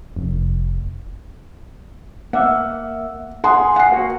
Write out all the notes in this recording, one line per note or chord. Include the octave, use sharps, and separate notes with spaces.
F1
A#3 E5 F#5
G#4 F#5 C6
F#5 C7
A#3 F#4